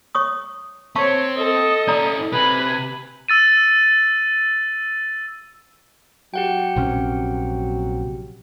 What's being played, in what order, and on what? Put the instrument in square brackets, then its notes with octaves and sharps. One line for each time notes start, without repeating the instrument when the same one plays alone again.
[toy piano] C#5 C#6 D#6
[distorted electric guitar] C4 [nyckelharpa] C#5 [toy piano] F5 A5 C#6
[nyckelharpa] A4 [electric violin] D#5
[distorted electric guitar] C#4 E4 [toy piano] D5 A#5
[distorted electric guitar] C3 [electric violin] B4 [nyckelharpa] G#5 B5
[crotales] E6 A6 D#7
[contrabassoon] F#3 [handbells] G4 F#5 G5
[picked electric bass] A#1 C3 C#4